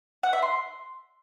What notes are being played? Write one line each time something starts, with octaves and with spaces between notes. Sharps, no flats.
F#5
E5
C6